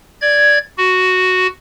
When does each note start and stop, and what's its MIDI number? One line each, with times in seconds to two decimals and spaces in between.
0.22 0.58 74
0.22 0.58 92
0.78 1.47 66